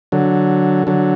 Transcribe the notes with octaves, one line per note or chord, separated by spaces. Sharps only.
D3 F#3
D3 F#3